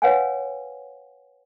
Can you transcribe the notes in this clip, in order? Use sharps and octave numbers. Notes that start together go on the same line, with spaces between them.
B4 C#5 F5 F#5 G#5